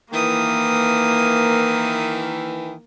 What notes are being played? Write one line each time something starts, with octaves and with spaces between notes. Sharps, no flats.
D#3 E3 A#3 D#6